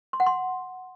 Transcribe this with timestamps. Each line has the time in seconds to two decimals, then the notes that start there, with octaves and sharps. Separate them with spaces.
0.13 C6
0.20 F#5
0.26 C6